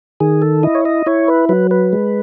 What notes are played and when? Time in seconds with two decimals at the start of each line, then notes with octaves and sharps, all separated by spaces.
0.20 D#3 G#4
0.42 A4
0.63 E4 D#5
0.75 C#5
0.85 D#5
1.06 E4 C#5
1.28 B4
1.49 F#3 B4
1.71 B4
1.93 G#3